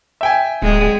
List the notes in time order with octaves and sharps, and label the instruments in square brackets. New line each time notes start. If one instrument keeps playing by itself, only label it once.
[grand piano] E5 G5 G#5
[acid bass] D1 [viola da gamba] G#3